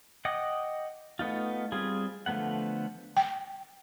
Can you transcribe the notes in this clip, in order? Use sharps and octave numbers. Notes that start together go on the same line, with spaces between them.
D#5 F#5 G5 D6 D#6
A3 B3 D#4 F4
G3 C4 F4 G#4
D3 F3 A3 B3 F#5
G5